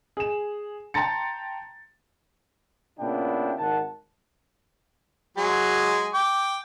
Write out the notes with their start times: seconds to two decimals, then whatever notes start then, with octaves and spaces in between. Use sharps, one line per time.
0.17 G#4 E7
0.94 G5 A5 A#5 C6 A6 C#7
3.00 A#2 C#3 B3 D4 E4 G5
3.58 G#1 D#3 F#5 A5
5.37 F#3 G#3 G#4
6.14 G5 D6